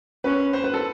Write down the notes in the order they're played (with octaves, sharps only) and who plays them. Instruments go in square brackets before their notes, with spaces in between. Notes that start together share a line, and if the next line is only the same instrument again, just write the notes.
[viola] C#4 [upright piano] B4
[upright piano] C5
B4
A4